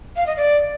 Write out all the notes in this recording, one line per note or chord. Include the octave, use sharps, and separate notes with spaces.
F5
D#5
D5